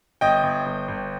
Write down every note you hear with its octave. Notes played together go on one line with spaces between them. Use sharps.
G1 D#5 G5
G1
G1
G1